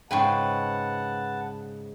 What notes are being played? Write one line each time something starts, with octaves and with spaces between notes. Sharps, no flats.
G#2 C#3 B4 C5 F#5 G5 A5 C#6